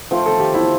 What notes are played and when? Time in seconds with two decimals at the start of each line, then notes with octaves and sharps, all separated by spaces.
0.11 F3 A3 C4 F4
0.26 A4
0.39 G4
0.54 E4